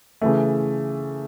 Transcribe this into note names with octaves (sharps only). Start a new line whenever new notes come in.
C#3 E3 A3